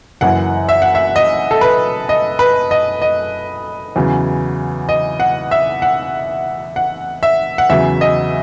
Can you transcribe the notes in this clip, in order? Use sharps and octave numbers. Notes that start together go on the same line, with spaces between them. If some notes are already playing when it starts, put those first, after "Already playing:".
F#1 F#2 E3 F#5
E5
F#5
E5
D#5
A4
B4
D#5
B4
D#5
D#5
E2 C#3 F#3
D#5
F#5
E5
F#5
F#5
E5
F#5
E2 C#3 F#3 E5
D#5